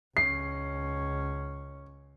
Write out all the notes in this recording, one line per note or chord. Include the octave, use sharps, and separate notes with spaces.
C#2 C#4 C7